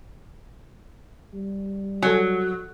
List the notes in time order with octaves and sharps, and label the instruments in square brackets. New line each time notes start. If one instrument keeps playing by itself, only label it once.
[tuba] G3
[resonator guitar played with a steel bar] F#3 [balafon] A4 G#5